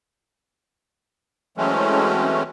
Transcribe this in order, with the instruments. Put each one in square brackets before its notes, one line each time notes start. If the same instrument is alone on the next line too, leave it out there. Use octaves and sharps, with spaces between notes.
[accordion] E3 F#3 G#3 A3 C4 C#4